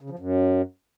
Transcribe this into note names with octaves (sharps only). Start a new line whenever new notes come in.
C#3
F3
F#2